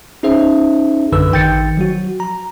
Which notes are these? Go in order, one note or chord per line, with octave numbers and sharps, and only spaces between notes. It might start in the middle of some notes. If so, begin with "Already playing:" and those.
C#4 D#4 G#4 C5 E5
A#1 F#2 D3 B4 E6
A1 D#3 G5 G6 A6 C#7
F3 F#3 F#4
A#5